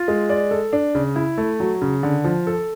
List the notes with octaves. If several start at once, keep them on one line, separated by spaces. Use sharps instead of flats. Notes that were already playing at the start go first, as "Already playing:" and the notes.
Already playing: F4
G#3
D5
A4
D4
C#3
E4
A3
F#3
C#3
D3
F3
A4